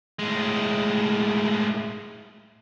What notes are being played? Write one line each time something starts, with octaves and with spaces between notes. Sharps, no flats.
A2 G#3